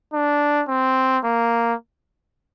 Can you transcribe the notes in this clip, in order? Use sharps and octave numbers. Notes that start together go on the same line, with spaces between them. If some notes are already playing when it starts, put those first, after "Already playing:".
D4
C4
A#3